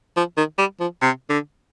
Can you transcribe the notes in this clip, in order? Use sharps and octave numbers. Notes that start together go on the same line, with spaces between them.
F3
D#3
G3
F3
C3
D3